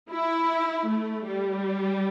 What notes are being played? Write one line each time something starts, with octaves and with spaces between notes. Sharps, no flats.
E4
A3
G3